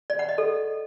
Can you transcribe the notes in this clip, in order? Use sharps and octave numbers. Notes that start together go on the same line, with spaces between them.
D5
F#5
D#5
A4